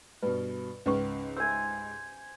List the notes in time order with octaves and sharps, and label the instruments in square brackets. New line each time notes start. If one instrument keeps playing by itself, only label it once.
[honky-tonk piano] G2 B2 [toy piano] B4
[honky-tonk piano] C#2 G#2 [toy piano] C#4 B4 C#6
[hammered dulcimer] C5 G#5 [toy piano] E6